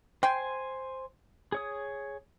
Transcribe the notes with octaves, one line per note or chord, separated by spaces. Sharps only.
C5 G5 G#5 C6
G#4 C#5 D#6